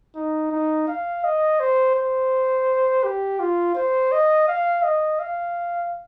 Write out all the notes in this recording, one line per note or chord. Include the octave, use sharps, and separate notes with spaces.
D#4
D#4
F5
D#5
C5
C5
G4
F4
C5
D#5
F5
D#5
F5